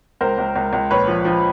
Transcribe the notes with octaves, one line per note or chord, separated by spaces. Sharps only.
C#2 A#4 C5
C#2
C#2
C#2
A#1 B4 C#5
F3
F3